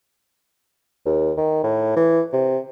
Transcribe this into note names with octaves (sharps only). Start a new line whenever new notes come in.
D#2
D#3
A2
E3
C3